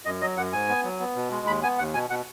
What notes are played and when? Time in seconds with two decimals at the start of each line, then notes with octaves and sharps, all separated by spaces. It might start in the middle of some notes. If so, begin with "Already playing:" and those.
0.05 F#2 D#5
0.21 F#3 D#5
0.37 F#2 F#5
0.53 G#2 G#5
0.69 B3
0.84 F#3
1.00 B3
1.16 B2
1.31 G#3
1.47 D#2 B5
1.63 B3 G#5
1.78 D#2 F#5
1.94 B2 G#5
2.10 B2 F#5